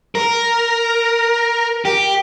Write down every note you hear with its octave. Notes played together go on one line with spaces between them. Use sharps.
A#4
G4